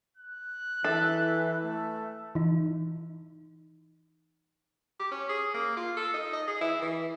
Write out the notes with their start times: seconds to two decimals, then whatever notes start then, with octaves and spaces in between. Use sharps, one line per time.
0.17 F#6
0.84 E3 A4 E5
1.62 A3
2.35 E3 D#4
4.99 G4
5.11 C#4
5.29 G#4
5.54 A#3
5.77 F4
5.97 A4
6.14 D#4
6.33 D#5
6.47 G#4
6.61 E4
6.82 E3